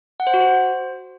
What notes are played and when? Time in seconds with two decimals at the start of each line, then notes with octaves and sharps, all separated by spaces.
0.20 F#5
0.27 C5
0.34 F#4
0.41 C5